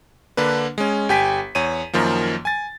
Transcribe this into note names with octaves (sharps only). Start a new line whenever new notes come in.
D3 A#3 D4 B4
G#3 C#4
G1 G4 G5 G#5 B6
E2 C#5 D#7
F#2 D#3 F3 A#3
G#5 A6